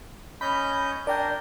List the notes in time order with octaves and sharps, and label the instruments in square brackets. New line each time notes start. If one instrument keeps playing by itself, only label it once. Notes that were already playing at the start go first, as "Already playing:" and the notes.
[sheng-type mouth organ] C#4 D#5 G6 [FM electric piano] B5
[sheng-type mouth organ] D4 A#4 [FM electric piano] D5 G5 G6